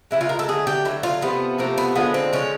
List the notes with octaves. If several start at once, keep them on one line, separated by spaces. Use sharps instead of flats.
C#3 F3 G#3 E4
F4
A#4
A4
D3 F#3 A3 G#4
G4
D3 F#3 A3 E4
F4
C3 F3 A3 B3
C3 F3 A3 A#3
B3
D3 F3 G#3 B3
C4
D3 F3 G#3 C#4